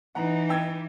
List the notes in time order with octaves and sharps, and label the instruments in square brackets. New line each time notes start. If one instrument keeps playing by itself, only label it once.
[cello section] E3 D#4 [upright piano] F#5 A#5
[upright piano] G5 E6 G#6